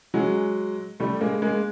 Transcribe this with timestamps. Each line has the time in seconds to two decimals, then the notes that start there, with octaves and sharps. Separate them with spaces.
0.14 F#3 G#3
1.00 G3 A3
1.21 G#3 A#3
1.42 G#3 A#3